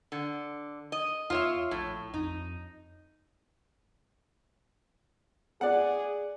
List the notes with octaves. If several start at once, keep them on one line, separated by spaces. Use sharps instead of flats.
D3
D#5
E2 F4 C#5 E5
A#1 A2
F2 D#4
G#4 D5 F#5